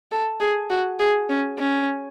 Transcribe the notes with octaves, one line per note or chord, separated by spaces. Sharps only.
A4
G#4
F#4
G#4
C#4
C#4